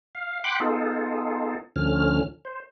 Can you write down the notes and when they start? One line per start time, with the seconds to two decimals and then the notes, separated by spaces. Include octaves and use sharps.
0.15 F5
0.44 F#5 G5 B5 C6 D6 F#6
0.60 B3 D#4 F4 G#4 A4
1.76 D2 D3 F3 C#4 F6
2.45 C5